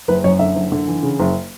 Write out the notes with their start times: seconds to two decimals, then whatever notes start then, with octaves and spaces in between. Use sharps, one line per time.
0.08 F#1 B4
0.24 F#2 C#5
0.39 D3 E5
0.55 F#1
0.72 D3
0.87 E3
1.03 C#3
1.19 F#1